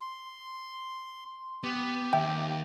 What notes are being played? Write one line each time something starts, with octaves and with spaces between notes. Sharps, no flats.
C6
B3 G4
D#2 E5 G5